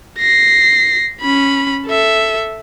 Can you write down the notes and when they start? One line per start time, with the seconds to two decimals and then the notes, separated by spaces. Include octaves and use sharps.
0.19 A#6 C7
1.21 C#4 B5
1.86 A4 E5